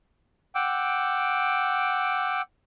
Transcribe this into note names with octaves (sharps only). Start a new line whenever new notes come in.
F#5 G5 D6 E6